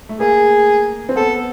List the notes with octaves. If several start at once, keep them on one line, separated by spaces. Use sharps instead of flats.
A3
A#3 G#4
C4
B3 A4